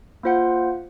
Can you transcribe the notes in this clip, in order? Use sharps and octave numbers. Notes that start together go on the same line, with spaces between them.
A#3 F4 C5 F#5